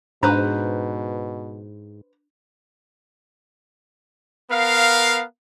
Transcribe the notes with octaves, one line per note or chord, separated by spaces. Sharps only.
G#2 B2 D4 B4 C5 A#5
B3 A#4 F5